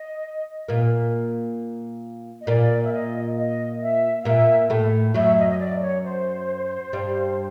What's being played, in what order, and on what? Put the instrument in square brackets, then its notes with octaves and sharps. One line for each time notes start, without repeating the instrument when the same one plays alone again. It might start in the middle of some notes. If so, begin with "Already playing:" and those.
Already playing: [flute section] D#5
[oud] A#2 A#3
[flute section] D#5
[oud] A#2 A#3 [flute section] D5
[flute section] E5
D#5
D#5
E5
F5
[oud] A#2 A#3 [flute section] E5
[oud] A2 A3
[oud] F#2 F#3 [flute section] E5
[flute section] D#5
D#5
D5
C#5
C5
[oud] G2 G3